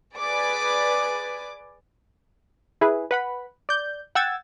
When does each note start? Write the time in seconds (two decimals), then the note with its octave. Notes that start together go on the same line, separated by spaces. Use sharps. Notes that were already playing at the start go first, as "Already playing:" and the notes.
0.17 G#4 B4 D5 G#5 D6
2.81 E4 G#4 B4
3.11 B4 F#5 B5
3.69 D5 G6
4.15 F#5 G5 E6 G#6 A6